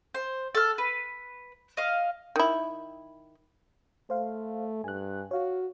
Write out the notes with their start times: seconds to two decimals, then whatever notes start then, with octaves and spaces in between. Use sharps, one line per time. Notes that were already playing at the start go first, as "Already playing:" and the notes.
0.15 C5
0.55 A4 F6
0.78 B4
1.77 D#5 F5
2.36 D#3 E4
4.10 A3 C5 F5
4.84 G2 G#5 F#6
5.31 F#4 C#5 F5